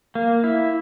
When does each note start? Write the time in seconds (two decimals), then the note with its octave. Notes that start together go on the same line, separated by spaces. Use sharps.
0.15 A#3
0.44 E4